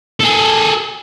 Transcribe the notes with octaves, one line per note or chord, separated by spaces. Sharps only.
G#4 A4